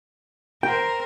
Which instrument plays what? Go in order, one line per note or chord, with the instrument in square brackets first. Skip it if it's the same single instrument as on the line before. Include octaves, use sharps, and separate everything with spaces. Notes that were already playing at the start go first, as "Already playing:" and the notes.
[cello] A#4 C5 [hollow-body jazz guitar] G5